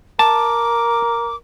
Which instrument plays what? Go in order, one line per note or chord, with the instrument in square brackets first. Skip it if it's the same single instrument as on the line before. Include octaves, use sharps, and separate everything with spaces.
[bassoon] A#4 [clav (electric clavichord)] A5 [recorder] D6